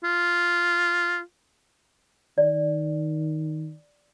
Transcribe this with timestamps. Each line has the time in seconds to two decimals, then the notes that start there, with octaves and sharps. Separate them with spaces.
0.04 F4
2.38 D#3 D5